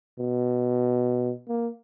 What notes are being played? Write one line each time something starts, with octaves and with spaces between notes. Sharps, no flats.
B2
A#3